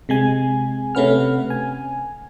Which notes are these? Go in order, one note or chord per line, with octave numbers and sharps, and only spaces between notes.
C3 G#3 G#5
C3 A3 C#4 B4 F#5 F6
G#5